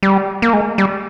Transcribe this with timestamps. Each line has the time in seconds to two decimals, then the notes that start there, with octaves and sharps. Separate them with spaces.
0.03 G3
0.42 A#3
0.53 G#3
0.78 G3